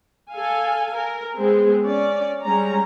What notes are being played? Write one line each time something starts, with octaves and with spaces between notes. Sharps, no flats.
A4 F5 G#5
A#4
G#3 B3 C4 G#4
C#4 D5
G3 G#3 C#4 A#5